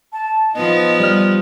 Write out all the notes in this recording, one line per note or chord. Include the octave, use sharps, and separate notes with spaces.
A5
F3 B3 D#4 D#5
G3 F6